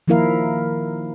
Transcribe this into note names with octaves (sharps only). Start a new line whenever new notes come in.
D#3 F3 A#3 E4 A#4 F5